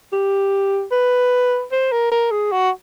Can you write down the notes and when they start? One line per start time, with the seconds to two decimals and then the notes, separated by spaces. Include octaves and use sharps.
0.13 G4
0.92 B4
1.72 C5
1.92 A#4
2.12 A#4
2.31 G#4
2.52 F#4